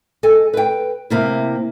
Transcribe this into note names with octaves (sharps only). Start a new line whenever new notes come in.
A4 D#5 G#5
B4 G5
C3 A#3 E4